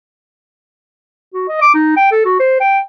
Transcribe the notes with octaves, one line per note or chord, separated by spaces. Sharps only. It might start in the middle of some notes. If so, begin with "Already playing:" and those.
F#4
D#5
D6
D#4
G5
A4
F#4
C5
G5